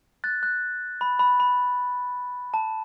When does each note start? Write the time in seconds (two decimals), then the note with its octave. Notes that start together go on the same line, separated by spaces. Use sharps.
0.24 F#6 A6
0.43 F#6
1.01 B5
1.19 B5
1.40 B5
2.54 A5